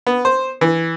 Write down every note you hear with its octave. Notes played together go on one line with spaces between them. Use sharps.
B3
C5
E3